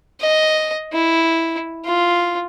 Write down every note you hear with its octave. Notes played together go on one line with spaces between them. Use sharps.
D#5
E4
F4